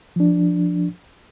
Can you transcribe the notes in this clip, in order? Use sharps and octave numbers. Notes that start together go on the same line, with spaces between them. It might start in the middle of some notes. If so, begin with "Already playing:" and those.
F3 D4